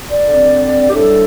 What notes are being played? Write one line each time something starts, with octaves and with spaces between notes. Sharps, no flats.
D5
D3 C4
G4
A2 G3 D4 A4